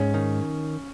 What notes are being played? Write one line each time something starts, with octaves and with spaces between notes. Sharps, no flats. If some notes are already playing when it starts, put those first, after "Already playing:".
Already playing: G#2 C#4
D#3